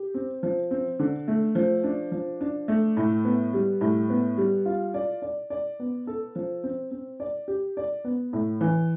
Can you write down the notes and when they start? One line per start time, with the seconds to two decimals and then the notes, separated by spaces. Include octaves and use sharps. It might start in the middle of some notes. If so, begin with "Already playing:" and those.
Already playing: G4
0.14 C4
0.43 F3
0.71 C4
0.99 D3
1.28 A3
1.55 F3
1.84 D4
2.12 F3
2.41 D4
2.68 A3
2.97 A2
3.25 B3
3.54 G3
3.81 A2
4.10 B3
4.38 G3
4.66 F4
4.94 D5
5.22 D5
5.50 D5
5.80 B3
6.07 A4
6.36 F3
6.64 C4
6.91 C4
7.20 D5
7.48 G4
7.77 D5
8.04 B3
8.33 A2
8.61 E3